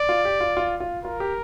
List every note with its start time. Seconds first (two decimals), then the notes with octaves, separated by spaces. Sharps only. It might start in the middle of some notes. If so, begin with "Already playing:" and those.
Already playing: D5
0.09 F4
0.25 G4
0.40 F4
0.57 F4
0.80 F4
1.04 F4 A#4
1.20 G4